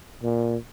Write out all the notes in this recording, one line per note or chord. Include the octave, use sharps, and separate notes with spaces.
A#2